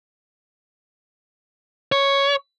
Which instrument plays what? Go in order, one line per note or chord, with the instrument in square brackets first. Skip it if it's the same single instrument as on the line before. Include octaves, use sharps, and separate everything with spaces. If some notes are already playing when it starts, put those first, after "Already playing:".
[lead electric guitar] C#5